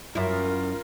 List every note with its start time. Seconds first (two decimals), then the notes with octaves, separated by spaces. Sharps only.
0.15 F#2 E4 F4 A#4